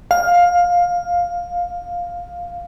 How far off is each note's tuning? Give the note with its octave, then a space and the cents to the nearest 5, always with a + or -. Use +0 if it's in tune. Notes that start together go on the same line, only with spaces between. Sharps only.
F5 +10